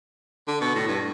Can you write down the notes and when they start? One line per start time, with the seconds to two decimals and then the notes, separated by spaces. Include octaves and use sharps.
0.48 D3
0.61 B2
0.75 A2
0.88 G2